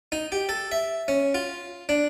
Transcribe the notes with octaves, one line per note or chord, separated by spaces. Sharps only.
D#4
G4
A4
E5
C#4
F4
D4